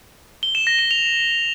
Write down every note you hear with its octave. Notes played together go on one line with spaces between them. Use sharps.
G7
E7
A#6
E7
F7